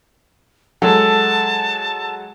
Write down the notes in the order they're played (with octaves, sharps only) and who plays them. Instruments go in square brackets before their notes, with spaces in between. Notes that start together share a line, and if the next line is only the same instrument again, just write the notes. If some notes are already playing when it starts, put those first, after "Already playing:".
[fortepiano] F#3 G#3 [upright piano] A4 [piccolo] A5